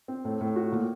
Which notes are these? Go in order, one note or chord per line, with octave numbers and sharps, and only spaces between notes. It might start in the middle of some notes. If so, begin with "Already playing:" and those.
C4
A2
A2
F#4
A#2